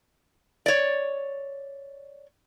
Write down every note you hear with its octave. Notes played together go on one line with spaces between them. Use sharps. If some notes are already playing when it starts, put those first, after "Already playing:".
C#5 D5